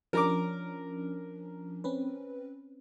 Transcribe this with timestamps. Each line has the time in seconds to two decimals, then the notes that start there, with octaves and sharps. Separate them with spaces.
0.13 F3 C#4 D4 A#4 A#5 D6
1.84 C4 C#4 B4